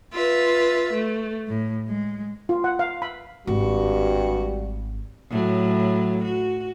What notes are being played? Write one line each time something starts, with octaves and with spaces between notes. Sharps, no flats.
F4 B4 E5
A3
A2
G#3
F4
F#5
F5
B5
G#1 G2 G3 F#4
A2 F#3
F#4